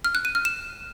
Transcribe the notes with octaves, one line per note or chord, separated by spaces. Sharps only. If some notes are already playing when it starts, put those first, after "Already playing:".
F6
F#6
D#7
F6
E7